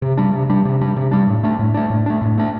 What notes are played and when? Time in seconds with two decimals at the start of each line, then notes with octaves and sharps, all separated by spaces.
0.02 C3
0.17 G3 D4
0.33 C3
0.50 G3 D4
0.65 C3
0.81 G3 D4
0.96 C3
1.12 G3 D4
1.28 A2
1.43 A3 D4
1.59 A2
1.74 A3 D4
1.90 A2
2.06 A3 D4
2.22 A2
2.38 A3 D4